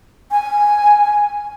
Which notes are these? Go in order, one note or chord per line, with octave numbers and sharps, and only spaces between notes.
G#5